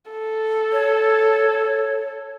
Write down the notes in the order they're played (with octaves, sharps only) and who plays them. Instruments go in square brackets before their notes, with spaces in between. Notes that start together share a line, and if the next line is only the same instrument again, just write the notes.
[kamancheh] A4
[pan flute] C#5